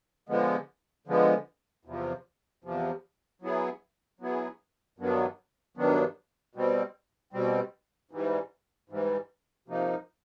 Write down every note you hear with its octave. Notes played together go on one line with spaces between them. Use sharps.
D3 F3 G#3 B3
D3 F3 G#3 B3
E2 C3 F3
E2 C3 F3
F#3 B3 E4 G#4
F#3 B3 E4 G#4
G2 D#3 F#3 B3 D4
G2 D#3 F#3 B3 D4
B2 G3 C4
B2 G3 C4
G#2 E3 G3
G#2 E3 G3
C3 F3 A#3 D#4